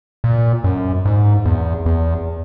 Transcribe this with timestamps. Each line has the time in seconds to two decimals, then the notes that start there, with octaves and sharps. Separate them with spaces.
0.24 A#2
0.64 F#2
1.05 G#2
1.45 E2
1.86 E2